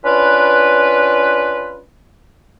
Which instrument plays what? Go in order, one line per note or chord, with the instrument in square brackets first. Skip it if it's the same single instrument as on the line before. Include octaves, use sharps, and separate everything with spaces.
[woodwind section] C#4 D4 F4 B4